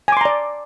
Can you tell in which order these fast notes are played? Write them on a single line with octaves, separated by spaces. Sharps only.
G#5 D6 C6 A#5 D5